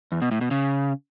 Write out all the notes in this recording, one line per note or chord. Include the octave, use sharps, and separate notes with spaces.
E2
B2
A2
B2
C#3